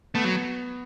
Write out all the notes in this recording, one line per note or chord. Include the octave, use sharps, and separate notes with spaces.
A3 B3
F#3